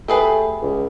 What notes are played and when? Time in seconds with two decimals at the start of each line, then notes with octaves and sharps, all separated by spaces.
0.08 A3 G4 G#4 B4
0.62 C#2